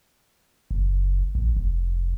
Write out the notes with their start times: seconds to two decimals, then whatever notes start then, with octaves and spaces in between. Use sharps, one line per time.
0.71 F#1
1.35 A1
1.56 F1